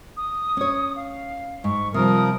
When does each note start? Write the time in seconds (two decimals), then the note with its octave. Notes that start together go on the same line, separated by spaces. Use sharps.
0.17 D#6
0.57 C#4 C#5
0.96 F5
1.64 G#2 C#6
1.94 C3 F3 G3 A#4 D#6